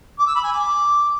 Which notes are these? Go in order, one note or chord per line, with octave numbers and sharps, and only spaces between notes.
D6
E6
B5
G#5
D6